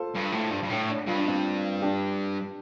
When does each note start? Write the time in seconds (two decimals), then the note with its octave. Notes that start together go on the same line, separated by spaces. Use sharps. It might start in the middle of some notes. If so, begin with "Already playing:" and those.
Already playing: F4 A4 C5
0.14 G2
0.32 A2
0.51 G2
0.63 G2
0.70 A2
0.89 D4
1.07 G2 F4
1.17 D4
1.28 C4 F4
1.82 D4 G4